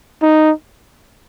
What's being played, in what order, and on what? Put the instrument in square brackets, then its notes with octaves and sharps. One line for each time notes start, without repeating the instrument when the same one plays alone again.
[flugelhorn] D#4